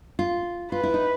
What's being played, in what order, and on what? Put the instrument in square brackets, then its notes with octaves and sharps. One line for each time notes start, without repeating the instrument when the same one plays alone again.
[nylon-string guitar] F4
[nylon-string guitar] F4 [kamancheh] B4
[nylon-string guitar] E4
D#4